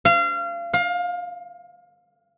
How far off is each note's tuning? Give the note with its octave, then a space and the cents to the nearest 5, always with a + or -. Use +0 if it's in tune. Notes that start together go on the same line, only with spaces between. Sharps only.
F5 -30
F5 +25